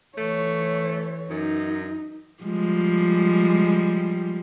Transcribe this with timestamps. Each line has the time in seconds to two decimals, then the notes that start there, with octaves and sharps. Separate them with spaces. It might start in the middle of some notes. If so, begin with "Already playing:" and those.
0.18 E3 A3 C#5
1.30 F#2 D#4
2.43 F3 G3 G#3